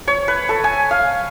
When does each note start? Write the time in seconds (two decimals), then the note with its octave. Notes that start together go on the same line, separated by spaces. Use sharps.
0.08 C#5
0.28 B4
0.49 A4
0.64 G#5
0.91 F5